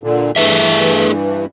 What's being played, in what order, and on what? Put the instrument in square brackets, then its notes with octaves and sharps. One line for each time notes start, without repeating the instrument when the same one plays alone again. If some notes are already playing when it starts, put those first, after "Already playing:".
[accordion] A#2 D3
[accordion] G2 E3 [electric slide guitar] A3 G#4 E5